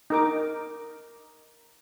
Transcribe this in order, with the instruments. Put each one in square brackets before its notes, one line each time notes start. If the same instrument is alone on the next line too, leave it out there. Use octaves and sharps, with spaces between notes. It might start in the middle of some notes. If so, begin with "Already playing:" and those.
[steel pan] D#4 A#4 D6